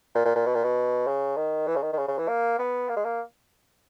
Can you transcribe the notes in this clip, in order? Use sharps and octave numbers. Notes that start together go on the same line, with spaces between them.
A#2
A#2
A#2
B2
A#2
B2
C#3
D#3
E3
C#3
D#3
D#3
C#3
C#3
E3
A#3
B3
A#3
G#3
A#3